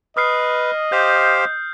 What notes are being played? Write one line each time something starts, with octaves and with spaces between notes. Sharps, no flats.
B4 D#5 D#6 F6 C7
G4 C5 F5 G6